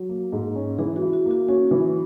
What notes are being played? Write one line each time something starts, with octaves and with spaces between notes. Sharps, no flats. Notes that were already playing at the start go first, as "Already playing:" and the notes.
Already playing: F#3
A#3
G#2
C#4
E3 G#4
F#4
E4
F#4
A#3
F#4
C#4 F#4
E3